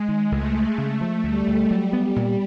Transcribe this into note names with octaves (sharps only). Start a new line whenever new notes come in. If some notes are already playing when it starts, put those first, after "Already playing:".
Already playing: G#3
D#3
C#2 A3
G#3
C#3 A3
F3
D2 G3
D2
F#3 G3
B3
A#2